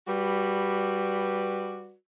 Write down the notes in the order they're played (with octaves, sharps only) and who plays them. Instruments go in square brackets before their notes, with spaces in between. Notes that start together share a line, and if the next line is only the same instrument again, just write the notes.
[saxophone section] G3 F#4 B4 D5